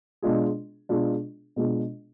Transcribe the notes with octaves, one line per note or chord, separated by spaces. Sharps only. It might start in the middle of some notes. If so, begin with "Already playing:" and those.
B2 G#3 D4 F4 G#4
B2 G#3 D4 F4 G#4
B2 G#3 D4 F4 G#4